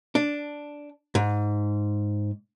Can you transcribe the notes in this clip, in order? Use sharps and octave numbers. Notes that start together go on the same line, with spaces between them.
D4
G#2